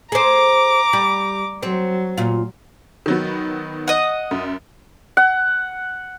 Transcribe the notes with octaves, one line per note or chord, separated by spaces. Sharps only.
G#4 C5 A#5 D6
G3
F#3 C4
A#2 F4
D#3 F#3 B3
D#5 F#5
F#2
F#5